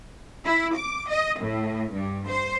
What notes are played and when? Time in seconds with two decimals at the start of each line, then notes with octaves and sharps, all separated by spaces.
0.44 E4
0.75 D6
1.09 D#5
1.40 A2
1.92 G2
2.28 C5